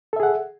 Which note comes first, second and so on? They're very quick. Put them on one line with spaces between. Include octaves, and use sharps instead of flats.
A4 E5 G#4 F#5